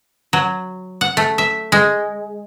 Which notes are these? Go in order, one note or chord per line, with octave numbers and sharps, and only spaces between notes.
F#3
F#5
A3
E5
G#3